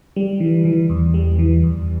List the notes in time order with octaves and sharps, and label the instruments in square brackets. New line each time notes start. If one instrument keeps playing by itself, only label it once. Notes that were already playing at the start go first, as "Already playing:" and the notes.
[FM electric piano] G3
E3
E3
E2
G3
E3
E2